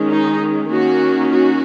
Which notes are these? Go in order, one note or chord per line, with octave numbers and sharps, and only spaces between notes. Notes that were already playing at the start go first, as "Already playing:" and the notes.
Already playing: D#3 G#3 C#4
D#4
D#3 A#3 C#4 F#4
F#4